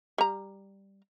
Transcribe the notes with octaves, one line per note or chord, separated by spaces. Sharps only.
G3 A#5